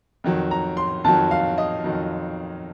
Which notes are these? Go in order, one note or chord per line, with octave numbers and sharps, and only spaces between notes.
F2 D#3 F#3
A#5
C6
F2 D#3 F#3 A5
F5
D#5
F2 D#3 F#3